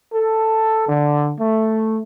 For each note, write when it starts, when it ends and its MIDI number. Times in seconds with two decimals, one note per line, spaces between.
0.13 0.83 69
0.88 1.32 50
1.40 1.99 57